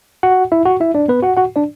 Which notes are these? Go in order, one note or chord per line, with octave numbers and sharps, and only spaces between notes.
F#4 F#5
E4 E5
F#4 F#5
E4 E5
D4 D5
B3 B4
F#4 F#5
F#4 F#5
D4 D5